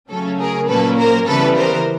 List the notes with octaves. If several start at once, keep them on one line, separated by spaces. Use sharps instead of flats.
C#3 F#3 A3 C#4 A4
G#4 A#4
A#2 F#3 A#3 C#4 A4 B4
A#4 C5
C#3 E3 G3 B3 A4 B4
A#4 C5